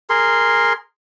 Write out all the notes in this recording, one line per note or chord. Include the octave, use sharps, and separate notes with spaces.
G#4 A#4 C6